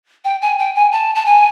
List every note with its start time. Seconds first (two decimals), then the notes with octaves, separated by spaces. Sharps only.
0.25 G5
0.42 G#5
0.59 G5
0.75 G#5
0.92 A5
1.15 A5
1.26 G#5